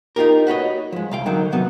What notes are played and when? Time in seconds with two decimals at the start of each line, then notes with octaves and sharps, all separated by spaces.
0.16 D#4 F4 G4 A#4
0.47 F#4 B4 C#5 D#5
0.92 F3 G#3
1.11 C2 F5 G5
1.26 D3 D#3 F#3
1.52 C3 F#3 B3